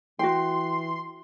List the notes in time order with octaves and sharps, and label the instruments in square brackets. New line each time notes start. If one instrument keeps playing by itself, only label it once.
[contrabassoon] E3 [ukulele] F#4 G5 [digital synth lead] C6